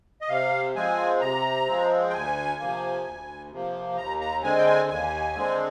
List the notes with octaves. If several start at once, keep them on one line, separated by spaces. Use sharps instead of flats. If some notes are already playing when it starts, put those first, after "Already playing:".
D#5
C3 F5
F3 G#3 C4 G#5
C3 A#5
F3 G#3 C4
G5
D2 G#5
C3 F3 A#3
D2
C3 F3 A#3
D#2 A#5
A#5
D3 G#3 C4 G#5
G5
G#5
D#2 G#5
D3 G#3 C4